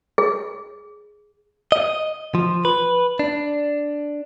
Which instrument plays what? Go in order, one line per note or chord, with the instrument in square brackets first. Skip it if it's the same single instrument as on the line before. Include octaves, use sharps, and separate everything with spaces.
[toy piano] G#4
[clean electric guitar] D#5
F3
B4
D4